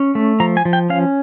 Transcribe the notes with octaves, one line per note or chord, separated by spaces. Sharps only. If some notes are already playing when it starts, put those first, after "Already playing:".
Already playing: C#4
A3
F3 A#5
G#5
F3
G5
C#4 F5